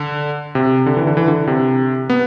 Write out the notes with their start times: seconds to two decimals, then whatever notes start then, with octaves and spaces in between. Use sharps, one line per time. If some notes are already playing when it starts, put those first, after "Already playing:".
Already playing: D3
0.55 C3
0.86 D3
0.97 E3
1.07 D3
1.17 E3
1.28 D3
1.47 C3
2.10 B3